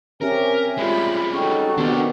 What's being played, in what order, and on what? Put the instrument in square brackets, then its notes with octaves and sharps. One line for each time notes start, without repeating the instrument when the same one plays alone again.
[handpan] C4 C#4 G4 [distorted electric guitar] A#4 [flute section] E5 G#5
[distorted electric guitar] G3 G#3 [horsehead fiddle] F4 B5
[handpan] C#4 [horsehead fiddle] D#4 F#4 [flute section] A4 G5 C#6
[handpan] D#3 B3 G4 [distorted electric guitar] D4 C5